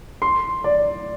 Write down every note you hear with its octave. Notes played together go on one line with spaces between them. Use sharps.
C6
D5